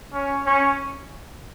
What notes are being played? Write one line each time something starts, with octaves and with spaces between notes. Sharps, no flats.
C#4
C#4